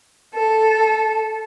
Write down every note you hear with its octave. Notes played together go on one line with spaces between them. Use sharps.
A4